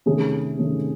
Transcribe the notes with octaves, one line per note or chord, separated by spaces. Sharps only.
C3 D#3 A3 C#4 G#4
C3 D#3 A3 C#4